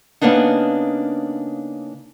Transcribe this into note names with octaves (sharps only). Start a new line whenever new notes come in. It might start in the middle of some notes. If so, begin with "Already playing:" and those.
C#3 A#3 B3 D4 D#4